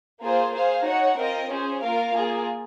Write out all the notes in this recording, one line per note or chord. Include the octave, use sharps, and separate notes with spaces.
A#3 F4 G#4 C5
G#4 C5 F5
D#4 F#4 C#5 F#5
C4 F4 A#4 D#5
C#4 G#4 C5
A#3 F4 A#4 F5
A#3 F4 G#4